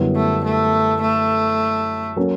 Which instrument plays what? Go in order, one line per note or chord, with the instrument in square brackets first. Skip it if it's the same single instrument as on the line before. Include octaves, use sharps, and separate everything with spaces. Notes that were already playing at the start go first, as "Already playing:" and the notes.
Already playing: [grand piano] F#2 D3 G3 B3 E4
[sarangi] A3
A3
A3
[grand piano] F#3 A#3 C#4